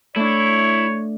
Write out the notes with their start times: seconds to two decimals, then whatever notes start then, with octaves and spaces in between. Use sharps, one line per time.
0.16 A3 D4 E4 C#5